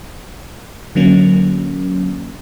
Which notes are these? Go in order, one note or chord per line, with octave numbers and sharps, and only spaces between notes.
D3 F#3 A#3 C#4